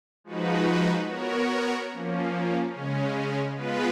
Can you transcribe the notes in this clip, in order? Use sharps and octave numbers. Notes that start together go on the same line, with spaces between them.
F3 G#3 D#4 F#4 B4
B3 F#4 A#4 C#5
F3 A#3 C#4
C#3 G#3 C#4
G#3 B3 F4 B4